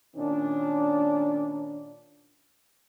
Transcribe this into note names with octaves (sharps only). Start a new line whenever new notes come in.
A#2 D#3 C#4 D4